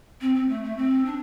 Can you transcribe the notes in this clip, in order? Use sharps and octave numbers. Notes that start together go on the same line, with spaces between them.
C4
C4
A3
A3
C4
D4